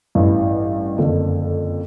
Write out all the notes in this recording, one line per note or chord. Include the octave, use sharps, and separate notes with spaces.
A1 G2 E3
F#1 F2 D3